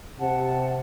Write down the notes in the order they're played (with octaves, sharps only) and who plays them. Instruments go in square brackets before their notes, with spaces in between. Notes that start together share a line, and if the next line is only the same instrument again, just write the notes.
[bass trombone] C3 [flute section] F#5 A5